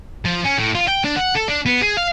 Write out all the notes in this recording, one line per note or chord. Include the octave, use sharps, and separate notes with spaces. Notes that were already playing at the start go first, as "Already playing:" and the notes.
F3
C#4
A2
F4
G5
D4
F#5
A4
D4
B3
G#4
F5